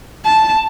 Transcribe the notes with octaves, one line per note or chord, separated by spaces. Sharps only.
A5